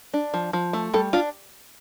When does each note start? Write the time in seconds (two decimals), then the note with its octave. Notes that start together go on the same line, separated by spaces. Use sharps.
0.14 D4
0.34 F3
0.53 F3
0.73 A3
0.94 G3 A4
1.13 D4 F4